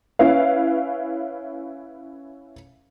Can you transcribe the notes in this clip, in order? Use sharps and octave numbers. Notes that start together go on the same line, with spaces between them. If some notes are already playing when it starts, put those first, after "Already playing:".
C#4 E4 B4 F5